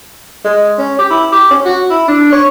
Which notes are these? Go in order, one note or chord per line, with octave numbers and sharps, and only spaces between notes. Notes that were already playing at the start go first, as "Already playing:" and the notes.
G#3
C#4
G4
E4
G4
C#4
F#4
E4
D4
C#5